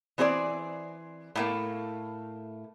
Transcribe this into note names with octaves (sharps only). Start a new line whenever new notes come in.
E3 C4 G#4 C5 D5
A2 A3 A#3